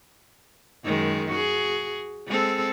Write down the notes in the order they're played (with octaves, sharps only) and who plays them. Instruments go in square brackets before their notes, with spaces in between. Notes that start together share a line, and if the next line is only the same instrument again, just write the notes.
[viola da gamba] F#2 D#3 G#3
F#4 G#4
G#3 C4 A4